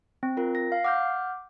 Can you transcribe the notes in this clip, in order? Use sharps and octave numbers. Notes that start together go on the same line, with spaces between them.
C4
F4 A#4
A#6
F5
F#5 D6 F6 G6